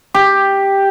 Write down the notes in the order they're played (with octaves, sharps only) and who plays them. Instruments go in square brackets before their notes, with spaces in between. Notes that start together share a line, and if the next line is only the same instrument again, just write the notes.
[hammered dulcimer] G4